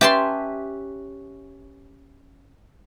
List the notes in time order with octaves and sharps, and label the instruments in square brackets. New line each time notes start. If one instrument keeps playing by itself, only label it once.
[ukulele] C#4 B4 E5 [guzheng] G4 A5 C6